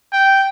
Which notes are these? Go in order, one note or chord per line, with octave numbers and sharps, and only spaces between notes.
G5